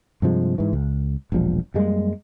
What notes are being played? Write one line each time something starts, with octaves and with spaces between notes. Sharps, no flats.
G2 C3 F3 G#3
G#2 E3
C#2
E1 A#1 F3 G3
F#2 G3 G#3 A#3